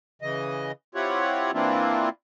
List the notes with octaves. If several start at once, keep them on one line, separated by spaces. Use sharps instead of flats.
C#3 E3 D#5
C4 E4 F4 G4 C#5 F#5
E3 A#3 C4 D4 E4 F4